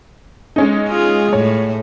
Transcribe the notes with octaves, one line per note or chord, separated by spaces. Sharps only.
G#3 C#4 D#4
F4 G#4
A2 C#5